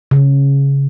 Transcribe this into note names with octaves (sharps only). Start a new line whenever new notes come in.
C#3